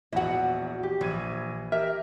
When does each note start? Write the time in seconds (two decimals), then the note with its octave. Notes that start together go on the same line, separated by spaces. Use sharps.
0.13 A#1 E2 E4 F#4 D#5 F#5
0.83 G4
1.01 A#1 E3 G#6 D#7
1.72 G4 A#4 E5 F6